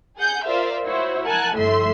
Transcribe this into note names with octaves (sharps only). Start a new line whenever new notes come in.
G#4 F#5 G6
F4 A#4 C5 D5 E5 F5
E4 F#4 C5 C#5
A#4 F#5 G#5 A5 F#6
G1 A2 F3 A3 E5 C6